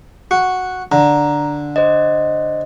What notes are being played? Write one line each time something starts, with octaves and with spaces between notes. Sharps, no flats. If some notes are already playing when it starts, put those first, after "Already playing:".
F#4 C#7
D3 A#5
C5 D5 D#5